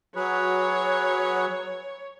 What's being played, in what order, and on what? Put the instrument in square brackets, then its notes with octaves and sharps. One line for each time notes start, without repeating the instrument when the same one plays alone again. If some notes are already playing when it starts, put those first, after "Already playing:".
[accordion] F#3 [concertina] F#4 G#4 B4 [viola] C#5